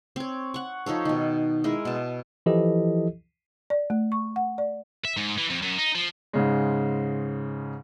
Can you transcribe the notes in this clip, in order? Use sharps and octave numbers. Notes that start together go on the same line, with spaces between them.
C4 C#5
F#5 C#6
F3 D#4 A4 C#5
B2 D#3
G#3 E4 A#4
B2 A5
E3 F3 E4 G4 A4 D#5
D5
A3
C#6
F#5
D5
E5
G#2
E3
F2
F#2
D#4
F3
G#2 C#3 G#3